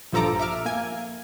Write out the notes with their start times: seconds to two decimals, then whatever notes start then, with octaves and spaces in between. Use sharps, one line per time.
0.12 A#1 G2 F3 A4 A#5 D6
0.39 E5 D6 F6
0.66 A#3 G#5 G#6